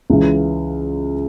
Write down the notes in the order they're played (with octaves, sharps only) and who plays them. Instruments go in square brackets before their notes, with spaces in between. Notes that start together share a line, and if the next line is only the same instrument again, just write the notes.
[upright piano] C#2 C#3 E3